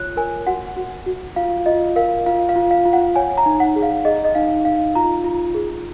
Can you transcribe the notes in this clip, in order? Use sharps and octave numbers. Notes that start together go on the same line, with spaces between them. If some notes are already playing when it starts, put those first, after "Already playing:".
Already playing: F4 C#5 F#6
A#4 G#5
F#4 F#5
F#4
F#4
F4 F5
F4 D#5
A#4 F5
F4 F5
F5
F4
F5
F4
F#5
C#5 G#5
A#5
D#4
F#5
G#4
F5
G#4 D#5
D#5
D#4 F5
D#4 F5
F4 A#5
F4
G#4